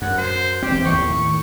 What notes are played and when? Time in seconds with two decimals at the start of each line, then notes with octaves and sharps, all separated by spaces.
0.02 F#2 F#5
0.18 C5
0.63 E1 C4 G4
0.86 D#2 A2 D#3 C#6